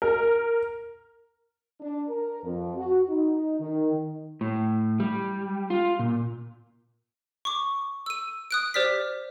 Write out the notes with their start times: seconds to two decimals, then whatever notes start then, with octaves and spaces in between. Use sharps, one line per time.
0.02 A#4
1.81 D4
2.09 A#4
2.44 F2
2.76 F#4
3.09 D#4
3.60 D#3
4.41 A2
5.00 G3
5.70 F4
5.99 A#2
7.45 C#6 D6
8.06 E6 D#7
8.51 D#6 F#6 D7
8.74 G4 C5 D5 F6 B6